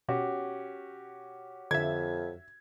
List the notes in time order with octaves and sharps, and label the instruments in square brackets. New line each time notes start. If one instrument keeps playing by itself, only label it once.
[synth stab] B2 [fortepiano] C#4 F#4 G4
[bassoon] F2 [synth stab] D3 E5 [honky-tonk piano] G#6